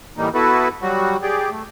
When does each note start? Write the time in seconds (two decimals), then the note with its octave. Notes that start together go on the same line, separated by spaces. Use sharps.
0.18 A2 E3 G3 A#3 D#4
0.34 B3 E4 F#4 A4 B4
0.82 F#3 G3 F#4
1.22 G4 G#4 D5
1.50 A3